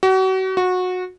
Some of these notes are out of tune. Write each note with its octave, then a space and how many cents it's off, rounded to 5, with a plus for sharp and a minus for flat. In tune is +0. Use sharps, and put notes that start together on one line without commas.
F#4 +35
F#4 -20